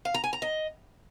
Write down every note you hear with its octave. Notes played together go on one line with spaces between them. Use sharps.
F5
A#5
G#5
A#5
D#5